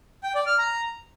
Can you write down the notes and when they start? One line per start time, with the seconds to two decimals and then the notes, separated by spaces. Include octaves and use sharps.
0.23 G5
0.35 D5
0.47 F6
0.58 A#5